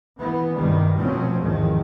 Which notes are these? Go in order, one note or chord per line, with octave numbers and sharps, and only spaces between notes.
E3 B3
E2 G2 C3 D#3 G3
F1 B2 F3 F#3 C4 C#4
A1 E2 G#2 D#3 F3